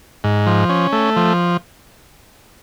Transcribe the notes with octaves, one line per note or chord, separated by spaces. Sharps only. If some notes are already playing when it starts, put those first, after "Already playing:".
G#2
F3
C#4
A3
F3